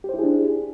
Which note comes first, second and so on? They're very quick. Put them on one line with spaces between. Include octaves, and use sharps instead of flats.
G4 C5 E4 G#4 D4